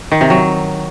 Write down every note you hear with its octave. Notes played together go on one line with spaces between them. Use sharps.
D#3
C3
F#3